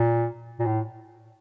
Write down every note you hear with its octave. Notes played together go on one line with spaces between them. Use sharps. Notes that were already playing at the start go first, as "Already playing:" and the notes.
Already playing: A#2
A#2
A2